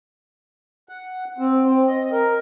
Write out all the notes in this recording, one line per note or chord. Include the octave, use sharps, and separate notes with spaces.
F#5
C4
C4
D#5
A#4